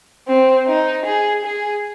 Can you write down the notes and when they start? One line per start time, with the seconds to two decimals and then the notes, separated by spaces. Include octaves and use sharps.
0.28 C4
0.68 D#4
1.06 G#4
1.45 G#4